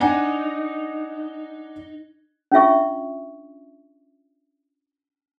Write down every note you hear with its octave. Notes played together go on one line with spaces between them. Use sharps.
D4 D#4 F#5 G#5
C#4 D4 F4 E5 C#6